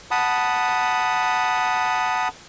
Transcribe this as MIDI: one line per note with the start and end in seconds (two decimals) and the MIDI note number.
0.11 2.28 78
0.11 2.28 81
0.11 2.28 83
0.11 2.28 87